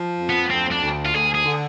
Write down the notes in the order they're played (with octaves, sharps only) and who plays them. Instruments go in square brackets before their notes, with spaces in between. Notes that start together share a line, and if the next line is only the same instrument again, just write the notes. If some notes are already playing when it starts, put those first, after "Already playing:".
Already playing: [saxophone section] F3
F2
[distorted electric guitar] B3
[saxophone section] D2 [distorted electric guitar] C4
[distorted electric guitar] D4
[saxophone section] D2
[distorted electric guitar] F4
[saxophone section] D2 [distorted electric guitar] G#4
[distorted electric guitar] G#4
[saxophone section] D3